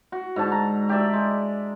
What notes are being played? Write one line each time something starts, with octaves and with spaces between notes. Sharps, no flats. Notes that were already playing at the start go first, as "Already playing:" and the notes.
F#4
G#2 D3 A5
A#5
G4 D5 E5
G#3